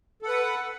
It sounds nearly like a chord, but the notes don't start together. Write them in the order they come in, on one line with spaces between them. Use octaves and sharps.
A4 F#5 B4